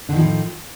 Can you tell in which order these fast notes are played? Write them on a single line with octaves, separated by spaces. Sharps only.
D3 D#3 F3 A2